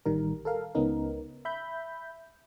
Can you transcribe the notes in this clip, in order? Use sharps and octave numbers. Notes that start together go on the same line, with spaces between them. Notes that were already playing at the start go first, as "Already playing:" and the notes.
A1 D#3 G3 A#4
A4 A#4 F5
C#2 B3 C#4 D#4 A#4
E5 B5 G6